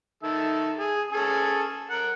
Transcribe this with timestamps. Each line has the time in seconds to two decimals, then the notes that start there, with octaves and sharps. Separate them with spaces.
0.23 D#3 A4 E5
0.78 G#4
1.12 C#4 G#4 A4
1.90 A#4 F#5